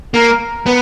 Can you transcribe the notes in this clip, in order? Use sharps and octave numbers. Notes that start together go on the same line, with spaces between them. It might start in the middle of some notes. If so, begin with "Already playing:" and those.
A#3 A#4
B3